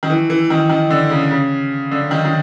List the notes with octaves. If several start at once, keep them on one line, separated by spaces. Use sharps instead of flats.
D#3
E3
E3
D#3
D#3
D3
C#3
C#3
D3
D#3
D#3